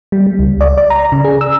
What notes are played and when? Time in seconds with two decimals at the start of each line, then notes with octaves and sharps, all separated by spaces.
0.12 G3
0.26 G3
0.39 C#2
0.61 D5
0.78 D5
0.90 A#5
1.12 C#3
1.24 G#4
1.41 E6